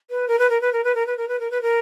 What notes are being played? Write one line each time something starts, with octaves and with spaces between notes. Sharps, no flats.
B4
A#4
B4
A#4
B4
A#4
B4
A#4
B4
A#4
B4
A#4
B4
A#4